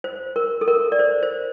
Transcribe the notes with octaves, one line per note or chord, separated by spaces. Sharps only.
C5
A#4
A4
A#4
D5
C5
C5